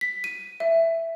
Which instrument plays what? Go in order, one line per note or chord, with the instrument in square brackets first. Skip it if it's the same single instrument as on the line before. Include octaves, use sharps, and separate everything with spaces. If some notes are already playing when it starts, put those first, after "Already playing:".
[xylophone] B6
D#7
E5